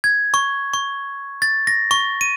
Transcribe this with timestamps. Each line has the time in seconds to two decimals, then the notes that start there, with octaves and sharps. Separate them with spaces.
0.04 G#6
0.34 C#6
0.74 C#6
1.42 A6
1.67 A#6
1.91 C#6
2.21 D#7